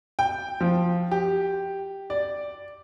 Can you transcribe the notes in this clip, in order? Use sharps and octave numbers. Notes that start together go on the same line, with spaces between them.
G5
F3
G4
D5